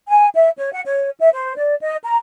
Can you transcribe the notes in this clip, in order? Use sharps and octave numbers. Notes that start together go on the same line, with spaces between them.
G#5
E5
C#5
F#5
C#5
E5
C5
D5
D#5
A#5